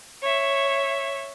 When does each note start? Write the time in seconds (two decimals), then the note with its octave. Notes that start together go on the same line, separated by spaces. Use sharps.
0.22 C#5 E5